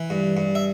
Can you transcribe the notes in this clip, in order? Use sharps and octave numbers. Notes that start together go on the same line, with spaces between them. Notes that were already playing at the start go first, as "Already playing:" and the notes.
Already playing: E3
G2
G2
E5